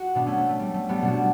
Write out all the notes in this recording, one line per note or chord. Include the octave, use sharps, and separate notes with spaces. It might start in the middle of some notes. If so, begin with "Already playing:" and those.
Already playing: F#4
B2 B3 D4
A3 C#4
A3
A3
G3
A3
G3 B3
B2 D4 F#4